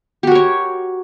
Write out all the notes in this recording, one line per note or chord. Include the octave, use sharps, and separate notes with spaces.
F#4 G4 A#4 C#5